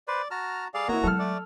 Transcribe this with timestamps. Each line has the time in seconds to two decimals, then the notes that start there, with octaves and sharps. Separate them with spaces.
0.08 B4 C5 D5
0.31 F#4 A5 A#5 F6
0.74 G3 G#4 A4 D5 F5
0.88 D#3 A#3 E4 F#4 C#5 D#5 A#5
1.03 F#3 G#3 A4 F#5 F6
1.19 A3 D5